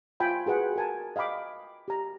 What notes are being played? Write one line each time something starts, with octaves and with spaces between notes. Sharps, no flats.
F4 G5 G#5 B5
F#4 G#4 B4 F#5
A#4 G#5 A5
D#5 F5 G5 B5 D6
G4 A#5